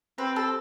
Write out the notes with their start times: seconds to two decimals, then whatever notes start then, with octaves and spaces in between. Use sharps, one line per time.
0.18 C4 B4
0.36 A4